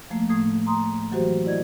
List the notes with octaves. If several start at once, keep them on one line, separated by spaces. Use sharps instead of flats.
F3 A3 A#3
A2 A3 D#6 G#6
A#5 C6 D#6
E3 F#3 F#4 G4 C5
E4 D5 D#5 G#6